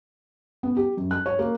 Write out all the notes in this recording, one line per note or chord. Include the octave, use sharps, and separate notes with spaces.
B3
G4
F#2
F#6
C#5
A#3